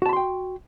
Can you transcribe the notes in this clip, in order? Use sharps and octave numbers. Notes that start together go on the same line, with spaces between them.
F#4 G5 A5 B5 C6